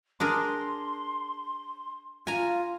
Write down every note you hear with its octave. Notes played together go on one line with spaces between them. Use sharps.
D4 G#4 A#4 C6
F4 G#5 A#5